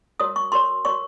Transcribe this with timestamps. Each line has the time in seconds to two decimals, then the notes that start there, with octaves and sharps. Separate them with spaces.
0.20 F#4 A#4 C#5 D#6
0.36 C#6
0.52 F#4 A#4 C#5 C6
0.85 F#4 A#4 C#5 C#6